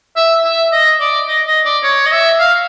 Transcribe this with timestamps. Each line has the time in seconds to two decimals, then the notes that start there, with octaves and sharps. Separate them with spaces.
0.17 E5
0.44 E5
0.72 D#5
1.00 D5
1.28 D#5
1.47 D#5
1.65 D5
1.84 C#5
2.06 D#5
2.12 E5
2.40 F5